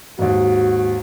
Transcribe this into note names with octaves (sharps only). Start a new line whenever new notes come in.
D#2 G#2 F#4